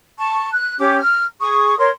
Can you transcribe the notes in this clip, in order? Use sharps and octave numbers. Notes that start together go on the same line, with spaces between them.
A5 C#6
F#6
C#4 G4 D6
F6
G#4 C#6 D#6
A#4 C#5 C6